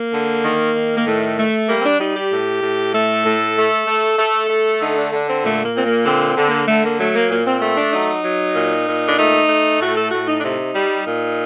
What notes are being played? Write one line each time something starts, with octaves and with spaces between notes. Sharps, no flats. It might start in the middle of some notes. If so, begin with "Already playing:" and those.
Already playing: A#3
D3
D#3
D#3
A#3
A2 A3
A3
G3 A#3
C4
D4
G3 D#4
G4
A2
A2
A3 A4
A2
A3
A3
A3 A4
A3
D3 D#4
D4
D3 D4
C4
A#2 A3
A#3
A#2 C4
A#3
D3 C4
C4
D3
A#3
D3 A3
A#3
F#3 A3
A#3
A#2 A#3
C4
A3 C4
D4
F#3 D#4
F#3
A#2
A#2
D4
A3 D#4
A3
A2 F#4
A4
A2 F#4
D#4
D4
C3 D#4
G3
A#2